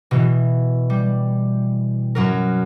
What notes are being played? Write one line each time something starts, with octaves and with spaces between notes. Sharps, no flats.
B2 E3
G3
F#2 F#3 A#4